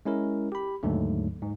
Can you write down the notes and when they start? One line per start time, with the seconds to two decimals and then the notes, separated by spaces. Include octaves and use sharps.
0.05 G#3 C#4 E4 A#4
0.52 G4 B5
0.83 D#2 G#2 D3 F#3 A3
1.42 G#2